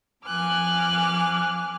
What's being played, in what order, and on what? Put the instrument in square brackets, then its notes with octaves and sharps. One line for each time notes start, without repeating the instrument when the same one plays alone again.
[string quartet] F2 F3 G#5 D6 F6 F#6